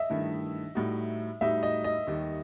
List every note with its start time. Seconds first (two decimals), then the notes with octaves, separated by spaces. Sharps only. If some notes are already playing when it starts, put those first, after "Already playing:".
Already playing: D#5 E5
0.10 G2 D#3 A3 E4
0.75 A2 G3 D#4 F#4
1.41 A2 G3 D#4 F#4 E5
1.63 D#5
1.84 D#5
2.07 D#2 D#3 G3